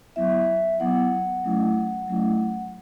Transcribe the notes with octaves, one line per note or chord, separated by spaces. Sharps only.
F#3 B3 E4 E5
F#3 B3 E4 F#5
F#3 A3 C#4 E4
F#3 A3 C#4 E4